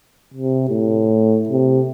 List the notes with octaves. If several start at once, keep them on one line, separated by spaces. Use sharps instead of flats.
C3
A2
C3